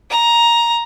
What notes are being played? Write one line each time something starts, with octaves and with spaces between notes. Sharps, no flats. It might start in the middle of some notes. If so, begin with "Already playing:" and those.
A#5